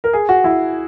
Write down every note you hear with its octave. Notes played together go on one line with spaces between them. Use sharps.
A#4
G#4
F#4
E4